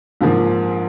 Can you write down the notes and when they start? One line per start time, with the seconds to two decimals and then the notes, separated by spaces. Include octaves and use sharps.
0.21 A#1 G#2 F3 A#3